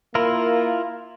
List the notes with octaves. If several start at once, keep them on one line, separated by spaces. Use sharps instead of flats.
A#3 E4 F4 A#4